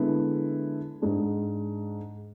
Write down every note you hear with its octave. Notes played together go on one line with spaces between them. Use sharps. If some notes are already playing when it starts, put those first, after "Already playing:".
Already playing: D3 G#3 B3 E4
G#2 G#3 D4